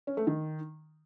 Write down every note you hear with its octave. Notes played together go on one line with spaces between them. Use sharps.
C#4
A3
D#3